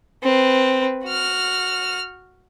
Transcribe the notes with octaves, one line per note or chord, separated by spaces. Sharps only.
C4 B4
F#4 F6